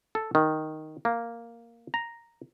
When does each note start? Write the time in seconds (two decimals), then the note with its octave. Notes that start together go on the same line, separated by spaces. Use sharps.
0.15 A4
0.35 D#3
1.05 A#3
1.94 A#5